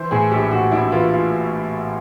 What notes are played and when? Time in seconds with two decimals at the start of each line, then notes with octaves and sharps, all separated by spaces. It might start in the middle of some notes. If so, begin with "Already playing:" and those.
Already playing: E3 C5
0.11 A2 G#4
0.31 A#1 G4
0.51 A2 F#4
0.72 A#1 E4
0.92 E3 F4
1.13 F4